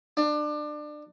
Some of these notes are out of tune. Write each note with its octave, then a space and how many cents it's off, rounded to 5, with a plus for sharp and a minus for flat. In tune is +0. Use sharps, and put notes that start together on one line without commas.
D4 +25